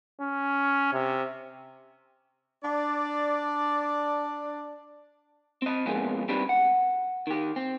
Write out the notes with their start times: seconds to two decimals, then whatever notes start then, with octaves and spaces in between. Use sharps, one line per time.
0.21 C#4
0.93 C3
2.64 D4 D5
5.62 C4 D#5
5.86 F2 C3 G#3 A#3 B3 C#4
6.28 G3 C4 D4 D#4 G4 B4
6.49 F#5
7.27 D#3 G4
7.56 C4